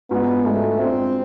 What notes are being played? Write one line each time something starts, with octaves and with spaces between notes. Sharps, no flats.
G#2 G#3 B3 D4 F4
G#2 G#3 A3 D4 F4
G#2 G#3 C4 D4 F4